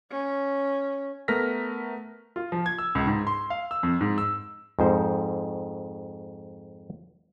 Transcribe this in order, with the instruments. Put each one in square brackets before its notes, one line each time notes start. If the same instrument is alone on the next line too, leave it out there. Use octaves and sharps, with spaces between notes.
[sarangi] C#4
[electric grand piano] A3 B3 A#4 F6 A#6 B6
[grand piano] F4
F3
G#6
E6
C#2
G#2
C6
F5
E6
F2
G#2
E6
[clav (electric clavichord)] F2 G#2 C5